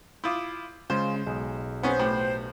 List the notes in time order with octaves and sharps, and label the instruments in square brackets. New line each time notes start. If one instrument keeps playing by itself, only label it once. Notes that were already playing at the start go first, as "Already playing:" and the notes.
[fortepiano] E4 F4 [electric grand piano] D6 D#6 G6
[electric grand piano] C#3 G#3 [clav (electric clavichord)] C#4 F4 [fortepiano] C5
[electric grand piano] B1 [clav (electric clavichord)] G#3
[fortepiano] B3 C#4 G#4 [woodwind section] C5
[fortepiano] A2 [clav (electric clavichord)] G4 B4